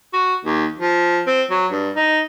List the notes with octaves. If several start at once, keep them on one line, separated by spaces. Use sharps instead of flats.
F#4
D#2
F3
C4
F#3
G2
D#4